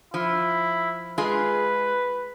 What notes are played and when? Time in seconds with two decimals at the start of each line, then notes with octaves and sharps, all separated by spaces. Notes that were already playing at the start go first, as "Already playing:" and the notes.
0.14 F3 E4
1.18 G#3 F4 G#4 B4